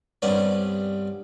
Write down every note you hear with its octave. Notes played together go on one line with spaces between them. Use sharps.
C2 G2 B3 C#4 D5